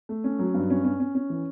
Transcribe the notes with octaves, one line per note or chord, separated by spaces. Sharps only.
A3
C#4
F#3
G2
C#4
C#4
C#4
C#4
E3